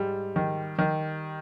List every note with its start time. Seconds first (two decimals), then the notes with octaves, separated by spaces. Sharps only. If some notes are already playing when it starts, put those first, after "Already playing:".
Already playing: G#2 G3
0.36 D#3
0.79 D#3